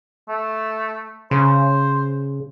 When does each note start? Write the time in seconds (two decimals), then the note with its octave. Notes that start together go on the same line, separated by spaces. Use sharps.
0.29 A3
1.31 C#3 C5